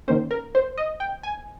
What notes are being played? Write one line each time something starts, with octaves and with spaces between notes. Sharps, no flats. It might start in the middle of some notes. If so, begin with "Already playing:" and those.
D#3 A#3 C#4 C5
A#4
C5
D#5
G5
G#5